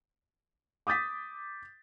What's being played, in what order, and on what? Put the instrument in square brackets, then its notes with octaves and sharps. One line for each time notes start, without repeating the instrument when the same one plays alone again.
[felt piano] D6 D#6 G6 A6 B6